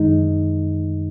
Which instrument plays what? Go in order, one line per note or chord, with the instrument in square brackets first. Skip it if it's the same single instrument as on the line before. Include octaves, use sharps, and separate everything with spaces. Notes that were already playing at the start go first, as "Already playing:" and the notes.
Already playing: [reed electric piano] F#2 D#3 G#3 D#4